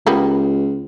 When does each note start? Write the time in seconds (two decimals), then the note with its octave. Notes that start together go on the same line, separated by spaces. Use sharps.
0.07 C#2 G3 A#3 B3